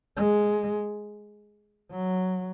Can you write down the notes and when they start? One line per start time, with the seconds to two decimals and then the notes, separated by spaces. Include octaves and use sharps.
0.16 G#3
1.91 F#3